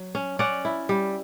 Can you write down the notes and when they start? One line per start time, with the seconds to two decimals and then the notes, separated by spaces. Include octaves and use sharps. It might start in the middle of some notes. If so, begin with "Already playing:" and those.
Already playing: F#3
0.15 C#4
0.39 C#4 D5 F#5
0.65 E4
0.89 G3